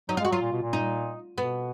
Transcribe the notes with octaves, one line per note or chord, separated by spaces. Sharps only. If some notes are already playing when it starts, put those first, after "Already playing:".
F#3 D#4
G#3 F4
F#4
F#3 F4
A#2
B2
A#2
D#4
B2 B3